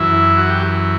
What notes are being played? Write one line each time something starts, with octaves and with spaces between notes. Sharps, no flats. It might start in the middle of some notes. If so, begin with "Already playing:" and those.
Already playing: F#2 E3 E4
F#4
G4